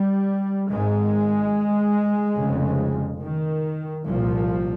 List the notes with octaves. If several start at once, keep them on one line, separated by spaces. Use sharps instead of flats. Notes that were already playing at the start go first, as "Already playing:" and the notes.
Already playing: G3
G#1 G#2 G#3
F1 F2 C#3
D#3
C2 A#2 F3